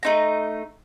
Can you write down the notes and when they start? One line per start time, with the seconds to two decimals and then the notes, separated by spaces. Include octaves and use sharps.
0.03 A3 D#4 A#5